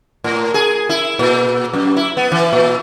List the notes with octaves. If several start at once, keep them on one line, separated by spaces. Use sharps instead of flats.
A2
G#4
E4
A#2
F#2
E4
B3
E3
A#2